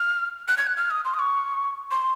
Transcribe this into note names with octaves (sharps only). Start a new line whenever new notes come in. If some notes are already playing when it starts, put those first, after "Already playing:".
Already playing: F6
F#6
G#6
F#6
F6
D#6
C6
D#6
C#6
C6